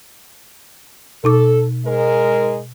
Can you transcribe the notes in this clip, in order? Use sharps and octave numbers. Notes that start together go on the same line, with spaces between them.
B2 D#4 A4 D6
G#2 G#3 A#4